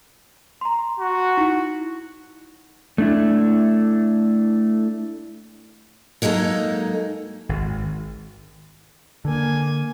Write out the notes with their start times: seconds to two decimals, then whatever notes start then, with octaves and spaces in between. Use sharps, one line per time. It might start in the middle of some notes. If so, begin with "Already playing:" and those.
0.61 A#5 C6
1.00 F#4
1.37 D#4 E4
2.98 A3 D4 E4
6.22 F#3 G#3 A#3 D#4 A4
7.49 G#1
9.25 D3 A#3 G#5